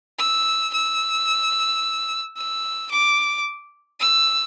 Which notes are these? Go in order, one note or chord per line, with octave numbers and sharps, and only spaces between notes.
E6
E6
E6
D6
E6